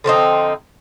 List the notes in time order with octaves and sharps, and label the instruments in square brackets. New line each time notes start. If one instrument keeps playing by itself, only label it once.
[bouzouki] D3 F3 C4 D#4